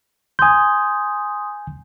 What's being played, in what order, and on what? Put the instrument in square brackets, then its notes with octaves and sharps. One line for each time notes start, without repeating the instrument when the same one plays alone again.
[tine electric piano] G#5 G6 [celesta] C6 D#6